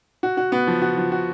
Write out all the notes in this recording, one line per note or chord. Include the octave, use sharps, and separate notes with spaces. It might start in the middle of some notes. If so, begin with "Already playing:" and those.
F#4
F#4
B3
F3
F#4
F3
F#4